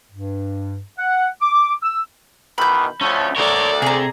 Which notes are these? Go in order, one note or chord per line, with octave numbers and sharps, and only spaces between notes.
G2
F#5
D6
E6
B2 D#3 E3 B5 G6
D2 F3 A3 C#4
D2 A4 A#4 C#5 D5
C3 G#4 A#5